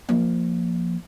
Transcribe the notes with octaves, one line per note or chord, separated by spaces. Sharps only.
F3 A#3